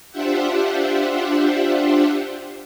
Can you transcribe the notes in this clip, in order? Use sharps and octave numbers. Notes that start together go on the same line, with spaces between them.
D4 F4 G4 C5 E5 F#5